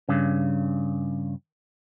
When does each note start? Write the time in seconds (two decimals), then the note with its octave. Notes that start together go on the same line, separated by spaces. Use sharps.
0.09 G2 C#3